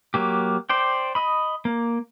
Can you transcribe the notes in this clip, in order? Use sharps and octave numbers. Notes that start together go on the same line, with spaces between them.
F#3 A#3 G4
C5 D5 G5
D#5 B5
A#3